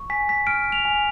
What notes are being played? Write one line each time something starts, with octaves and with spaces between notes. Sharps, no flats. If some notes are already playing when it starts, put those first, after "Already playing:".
Already playing: C#6
G#5 B6
B6
F6 D7
F7
G#5